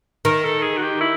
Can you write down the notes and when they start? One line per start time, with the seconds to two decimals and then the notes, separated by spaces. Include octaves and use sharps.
0.25 D#3 A#4
0.45 A4
0.63 G#4
0.77 F#4
0.82 G4
1.01 E4